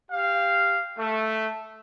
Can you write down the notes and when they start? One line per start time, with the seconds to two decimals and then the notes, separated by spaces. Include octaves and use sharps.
0.11 G4 F5
0.98 A3